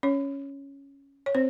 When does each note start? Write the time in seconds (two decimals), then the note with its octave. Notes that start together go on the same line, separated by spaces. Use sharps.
0.03 C#4 C#5
1.26 C#5
1.35 C4 C5